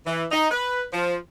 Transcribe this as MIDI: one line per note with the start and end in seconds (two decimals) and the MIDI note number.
0.06 0.25 52
0.32 0.48 63
0.51 0.83 71
0.93 1.17 53